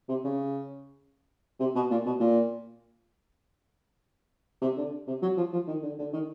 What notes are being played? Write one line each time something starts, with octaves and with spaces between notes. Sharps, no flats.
C3
C#3
C3
B2
A#2
B2
A#2
C3
D3
C3
F#3
F3
F3
D#3
D3
D3
D#3